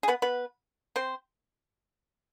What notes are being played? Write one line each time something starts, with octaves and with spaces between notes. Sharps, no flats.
G#4
B3 B4
B3 B4
C4 C5